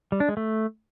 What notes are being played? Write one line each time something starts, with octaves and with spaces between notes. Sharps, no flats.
G3
D4
G#3
A3